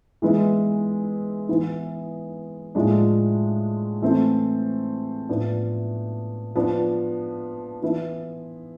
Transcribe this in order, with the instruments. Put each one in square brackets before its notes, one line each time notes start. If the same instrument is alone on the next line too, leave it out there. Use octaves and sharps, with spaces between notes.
[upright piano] E3 G#3 B3 E4
E3 B3 E4
A2 F3 G#3 D4
E3 A3 C4 E4
A2 F3 B3 D4
F3 B3 D4
E3 B3 E4